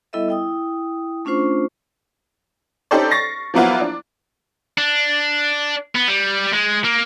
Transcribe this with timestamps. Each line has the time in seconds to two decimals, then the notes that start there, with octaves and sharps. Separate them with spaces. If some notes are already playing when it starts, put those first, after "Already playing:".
0.13 G3 B3 E4 A4 D#5 E5
0.29 E4 G5 D#6
1.25 A3 C#4 D4 F4 C5 C#6
2.91 C#4 D#4 G4 A4 C5 D5
3.11 C#6 A6 A#6 C7
3.54 F3 F#3 A#3 B3 E4 F4
3.81 D4
4.78 D4
5.96 B3
6.08 G3
6.54 G#3
6.85 A#3